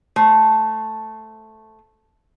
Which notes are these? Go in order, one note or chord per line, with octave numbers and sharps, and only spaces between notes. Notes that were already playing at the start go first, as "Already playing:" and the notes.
A3 C5